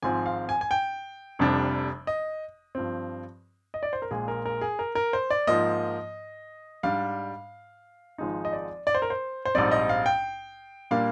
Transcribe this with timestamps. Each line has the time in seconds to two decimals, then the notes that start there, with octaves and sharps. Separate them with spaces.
0.03 G#1 G#2 F3 C4 G#5
0.26 F5
0.49 G#5
0.61 G#5
0.71 G5
1.39 F1 F2 C3 G3 D4
2.07 D#5
2.75 G2 F3 C4
3.74 D#5
3.83 D5
3.93 C5
4.02 A#4
4.11 A#1 A#2 G#3 G#4
4.28 A#4
4.45 A#4
4.61 G#4
4.79 A#4
4.95 A#4
5.13 C5
5.30 D5
5.47 G#2 F3 A#3 D#5
6.83 G#2 G3 D4 F5
8.18 G#1 G#2 F3 G#3 D#4
8.45 D#5
8.53 D5
8.87 D5
8.95 C5
9.02 A#4
9.10 C5
9.45 C5
9.55 A#1 G#2 G3 C4 D#4 D5
9.71 D#5
9.89 F5
10.06 G5
10.91 A#2 G3 A#3 D4 F5